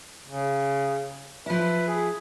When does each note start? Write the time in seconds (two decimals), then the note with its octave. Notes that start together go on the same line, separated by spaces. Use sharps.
0.26 C#3
1.46 F3 E4 B4
1.88 G#4